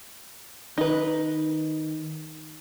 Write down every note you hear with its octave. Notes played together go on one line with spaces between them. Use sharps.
D#3 D#4 B4